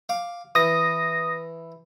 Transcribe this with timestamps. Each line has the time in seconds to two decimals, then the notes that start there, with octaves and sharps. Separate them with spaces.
0.09 F5 D6
0.55 E3 D#6 A#6